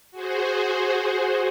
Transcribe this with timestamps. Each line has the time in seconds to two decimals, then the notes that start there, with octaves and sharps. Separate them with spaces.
0.11 F#4 G#4 C5